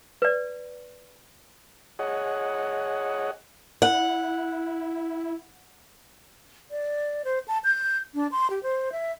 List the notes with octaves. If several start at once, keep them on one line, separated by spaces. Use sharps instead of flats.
B4 D5
G#4 C#5 D#5 F#5
E4 F#5
D5
C5
A5
G6
D4
C6
G4
C5
E5